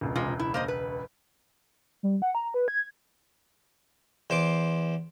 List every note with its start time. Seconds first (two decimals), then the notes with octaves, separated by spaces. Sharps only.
0.01 E1 C#2
0.16 C3 G#3 F4
0.39 E4
0.54 A#3 C5 D#5
0.68 B4
2.03 G3
2.22 F#5
2.35 A#5
2.54 B4
2.68 G#6
4.30 E2 C5 C6 D6